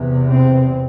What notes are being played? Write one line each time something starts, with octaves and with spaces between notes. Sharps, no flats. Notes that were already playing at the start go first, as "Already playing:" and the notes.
Already playing: E2 C3
C4